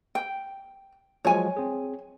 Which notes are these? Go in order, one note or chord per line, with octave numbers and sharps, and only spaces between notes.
G5
F3 F#3 G#3 C#5 G#5
C4 G#4